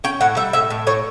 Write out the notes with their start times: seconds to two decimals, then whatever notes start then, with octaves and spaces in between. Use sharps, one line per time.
0.04 C#4 G5
0.21 A2 F#5
0.37 G3 E5
0.53 A2 E5
0.70 A2
0.87 A2 C#5